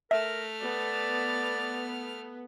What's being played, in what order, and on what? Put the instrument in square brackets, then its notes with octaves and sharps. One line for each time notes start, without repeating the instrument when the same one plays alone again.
[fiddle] A3 F6 [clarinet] A#4 [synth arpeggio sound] E5
[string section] B3 [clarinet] D5